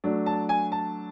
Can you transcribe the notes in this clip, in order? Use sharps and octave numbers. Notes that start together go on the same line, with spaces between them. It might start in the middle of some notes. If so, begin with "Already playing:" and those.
F#3 A3 D4
A5
G#5
A5